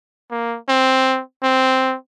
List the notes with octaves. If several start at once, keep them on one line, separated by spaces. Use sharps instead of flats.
A#3
C4
C4